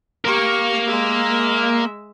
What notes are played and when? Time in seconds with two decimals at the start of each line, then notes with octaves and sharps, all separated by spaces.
0.25 A#3 G4 A#4 C#6
0.87 G#3 E5